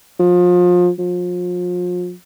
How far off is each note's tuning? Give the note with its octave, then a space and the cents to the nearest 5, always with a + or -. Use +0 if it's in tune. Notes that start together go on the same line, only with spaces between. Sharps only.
F3 +30
F3 +35